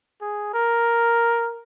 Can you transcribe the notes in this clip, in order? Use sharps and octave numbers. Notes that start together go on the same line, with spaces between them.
G#4
A#4